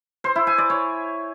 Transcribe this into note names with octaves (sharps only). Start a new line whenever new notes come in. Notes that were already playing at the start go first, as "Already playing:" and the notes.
C5
E4
G#5
D5
C#5